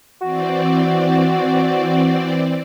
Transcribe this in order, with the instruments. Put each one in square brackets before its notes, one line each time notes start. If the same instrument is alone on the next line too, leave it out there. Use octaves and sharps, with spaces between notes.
[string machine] E3 C4 D5 [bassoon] F#4